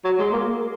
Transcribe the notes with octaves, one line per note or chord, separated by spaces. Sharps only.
F#3
G#3
A#3